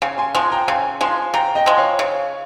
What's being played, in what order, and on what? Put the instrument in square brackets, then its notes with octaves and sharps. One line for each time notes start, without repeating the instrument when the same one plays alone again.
[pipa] C#3 [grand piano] F5 G#5
[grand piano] G#5 C6
[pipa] F3 G#3 [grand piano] G#5 C6
[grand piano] G5 A#5
[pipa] C#3 [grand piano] G#5 C6
[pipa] F3 G#3 [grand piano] G#5 C6
[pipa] C#3 [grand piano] G5 A#5
[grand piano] D#5 G5
[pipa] F3 G#3
[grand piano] C#5 F5
[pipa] C#3